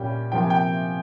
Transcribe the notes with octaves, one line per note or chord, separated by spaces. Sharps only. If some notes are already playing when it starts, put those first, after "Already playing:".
Already playing: A#2 G3 A#3 C#4 G5
C3 F3 A#3 G5
G#5
G5